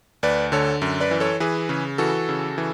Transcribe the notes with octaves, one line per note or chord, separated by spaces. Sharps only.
D2 B4 D5
D3 A4 C#5
F#2
B4 D5
E3
A4 C#5
E3 G#4 B4
C#3
E3 F#4 A4
C#3
E3